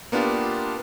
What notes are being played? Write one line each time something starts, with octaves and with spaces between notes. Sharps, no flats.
A#3 B3 D4 F4 G4